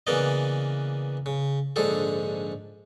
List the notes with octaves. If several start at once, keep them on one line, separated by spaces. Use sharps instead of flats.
C#3 E3 A#3 B3 D5 D#5
C#3
A#1 G#2 D3 G#4 A4